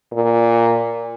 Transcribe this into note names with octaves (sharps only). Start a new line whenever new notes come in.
A#2